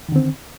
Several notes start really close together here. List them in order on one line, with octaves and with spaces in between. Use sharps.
D#3 D3 C4